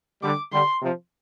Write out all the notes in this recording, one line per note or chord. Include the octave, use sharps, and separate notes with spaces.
D3 G3 D6
D3 G3 C6
C3 F3